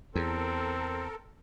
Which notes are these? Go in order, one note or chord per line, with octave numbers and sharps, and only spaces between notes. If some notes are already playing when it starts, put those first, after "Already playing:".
E2 C4 A4 A#4